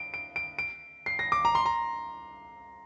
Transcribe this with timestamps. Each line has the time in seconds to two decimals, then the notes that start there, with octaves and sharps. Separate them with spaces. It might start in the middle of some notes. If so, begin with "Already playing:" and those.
Already playing: D7
0.14 D7
0.36 D7
0.59 D7
1.06 C7
1.19 A#6
1.32 D6
1.45 A#5
1.55 C6
1.66 A#5